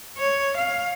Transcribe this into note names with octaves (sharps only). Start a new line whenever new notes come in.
C#5
F5